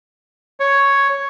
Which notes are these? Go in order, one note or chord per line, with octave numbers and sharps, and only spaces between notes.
C#5